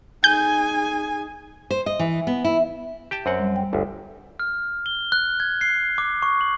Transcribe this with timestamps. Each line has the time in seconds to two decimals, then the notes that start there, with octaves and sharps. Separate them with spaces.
0.24 D#4 G#4 G#5 G6
1.71 C5
1.86 D#5
1.99 E3
2.27 B3
2.45 E4
3.11 G4 G5 A5
3.26 F#2 C4 C5 F#5
3.39 G3
3.56 G5
3.73 G1 D2
4.40 F6
4.86 G7
5.12 F#6
5.40 G#6
5.61 C7
5.98 D6
6.22 C#6
6.41 F#7